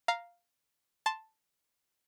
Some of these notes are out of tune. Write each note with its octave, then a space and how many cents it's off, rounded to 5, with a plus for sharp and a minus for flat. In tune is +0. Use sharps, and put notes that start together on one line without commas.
F5 +0 A#5 +0
A5 +0 C6 +0